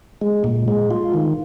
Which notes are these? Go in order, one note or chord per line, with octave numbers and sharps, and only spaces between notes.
G#3
A#2
G#3
F4
D#3